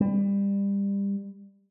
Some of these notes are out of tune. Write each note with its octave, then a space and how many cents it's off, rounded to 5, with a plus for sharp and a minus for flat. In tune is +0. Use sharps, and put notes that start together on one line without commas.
G3 +25